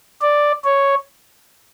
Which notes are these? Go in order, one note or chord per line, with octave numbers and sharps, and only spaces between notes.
D5
C#5